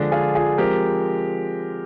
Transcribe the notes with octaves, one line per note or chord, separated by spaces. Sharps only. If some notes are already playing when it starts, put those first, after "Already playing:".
Already playing: D3 F3 G#3 D4
F4 G#4
F4 G#4
F3 G#3 C4 G4 A#4